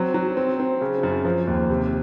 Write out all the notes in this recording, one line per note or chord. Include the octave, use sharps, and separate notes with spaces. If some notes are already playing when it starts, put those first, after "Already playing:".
Already playing: F#3 C4
F#3
C4
C4
C#3
F#2
F3
D#2
C3